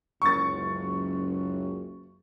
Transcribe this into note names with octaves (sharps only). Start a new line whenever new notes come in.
F#1 C#2 F#2 C#6 A6